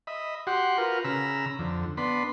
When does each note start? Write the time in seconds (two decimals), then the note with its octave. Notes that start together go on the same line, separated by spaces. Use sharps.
0.07 D#5 E5 B5
0.47 F#4 G4 F#5 C6
0.78 F4 F#4 A#4 B4
1.04 C#3 A#5 B5 E6
1.59 F2 D3
1.97 B3 D4 B5 C6